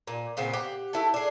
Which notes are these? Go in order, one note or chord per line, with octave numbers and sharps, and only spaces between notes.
A#2
A#2 C#3 B3 C4
G4 F#5
A3 E4 A4
D4 G#4